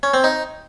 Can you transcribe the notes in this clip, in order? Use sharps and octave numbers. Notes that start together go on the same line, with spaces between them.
C#4
C4
D#4